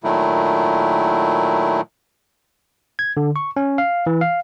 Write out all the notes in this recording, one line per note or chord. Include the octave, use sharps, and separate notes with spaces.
A#2 D#3 F#3 A3 E4
G#6
D3
C#6
C#4
F5
E3
F5